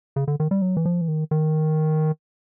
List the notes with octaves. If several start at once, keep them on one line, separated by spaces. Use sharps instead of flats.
C#3
D3
D#3
G3
F#3
E3
F3
E3
D#3
D#3